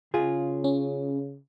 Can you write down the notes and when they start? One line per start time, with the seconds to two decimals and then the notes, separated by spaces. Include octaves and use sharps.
0.14 C#3 F4 G#4
0.64 C#4